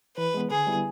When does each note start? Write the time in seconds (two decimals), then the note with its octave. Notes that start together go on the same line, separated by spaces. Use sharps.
0.17 E3 B4
0.34 G#3 B3
0.51 D3 G#4
0.67 G3 B3 E4